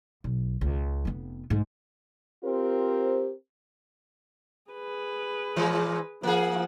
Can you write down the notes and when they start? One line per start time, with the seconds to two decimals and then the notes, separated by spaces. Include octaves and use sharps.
0.24 B1
0.61 C#2
1.05 F1 B3
1.50 G#2 A3
2.43 C4 F4 G4 A#4 C5
4.71 G#4 B4
5.56 A#2 E3 G#3
6.23 F3 A#3 G#4 F#5